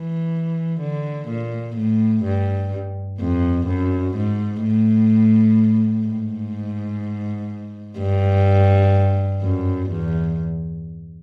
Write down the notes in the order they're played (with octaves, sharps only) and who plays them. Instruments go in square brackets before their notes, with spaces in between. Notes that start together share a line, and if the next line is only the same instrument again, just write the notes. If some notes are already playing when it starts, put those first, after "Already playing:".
Already playing: [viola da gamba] E3
D3
A#2
A2
G2
F2
F#2
G#2
A2
G#2
G2
F#2
E2